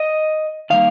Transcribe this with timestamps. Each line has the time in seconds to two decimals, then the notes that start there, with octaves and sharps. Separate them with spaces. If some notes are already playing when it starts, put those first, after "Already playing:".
Already playing: D#5
0.70 D#3 G3 A#3 F5